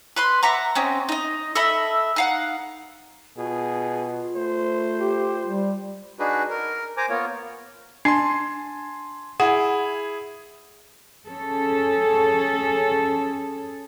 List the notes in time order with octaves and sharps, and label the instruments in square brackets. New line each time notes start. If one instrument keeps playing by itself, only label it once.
[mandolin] B4 B5 C6
E5 F#5 A#5 D6
C4 C#4 D#4
D#4 D#5
A4 D#5 E5 B5
D#4 F5 F#5
[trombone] B2 [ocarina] F4 [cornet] G#4
[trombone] A3 [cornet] C5
[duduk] G4
G3
[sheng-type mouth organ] D4 D#4 F#4 G#4 B4
A#4
C5 G#5 A#5 D6
A#3 B3 F4 C#5
[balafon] D4 [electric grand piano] G#5 A5 C6
[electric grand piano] E4 G#4 [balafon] F#5
[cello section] C#4 G#4 A4